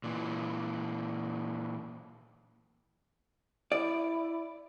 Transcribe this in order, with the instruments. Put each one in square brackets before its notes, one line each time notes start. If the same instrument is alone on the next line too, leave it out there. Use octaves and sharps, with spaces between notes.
[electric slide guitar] A#2 E3
[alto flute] E4 [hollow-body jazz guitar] D5